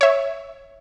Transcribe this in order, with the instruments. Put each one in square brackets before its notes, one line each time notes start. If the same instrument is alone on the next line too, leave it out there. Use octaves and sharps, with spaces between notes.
[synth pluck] C#5 E5